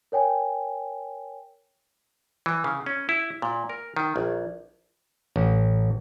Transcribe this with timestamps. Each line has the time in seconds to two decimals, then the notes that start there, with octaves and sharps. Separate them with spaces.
0.12 A#4 C#5 G5 G#5
2.46 E3
2.64 C#3
2.86 C#4
3.09 E4
3.42 A#2
3.70 A#4
3.97 D#3
4.16 A#1
5.36 A1